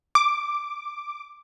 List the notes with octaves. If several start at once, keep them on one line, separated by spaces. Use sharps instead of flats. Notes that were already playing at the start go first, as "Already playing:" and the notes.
D6